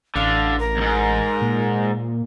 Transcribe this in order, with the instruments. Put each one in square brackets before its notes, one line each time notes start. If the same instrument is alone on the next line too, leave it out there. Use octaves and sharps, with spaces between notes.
[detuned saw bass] A1 [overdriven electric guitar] D3 [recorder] F5
[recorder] A#4
[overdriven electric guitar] D#2 G#2
[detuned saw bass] A#2